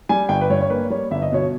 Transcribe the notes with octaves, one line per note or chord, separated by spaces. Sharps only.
G3 G#5
G1 G5
B4
G2 C#5
C#5
A#3 B4
G3 C#5
G1 E5
D#5
B2 C#5